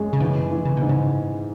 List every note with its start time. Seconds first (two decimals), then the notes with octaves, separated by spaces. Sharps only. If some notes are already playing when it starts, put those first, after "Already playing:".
Already playing: F#2 G#3
0.13 C#3
0.20 F#2 B2 E3
0.51 E3
0.65 C#3
0.77 G#2 B2
0.89 C#3